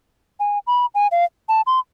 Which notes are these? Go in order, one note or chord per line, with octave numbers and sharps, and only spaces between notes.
G#5
B5
G#5
F5
A5
C6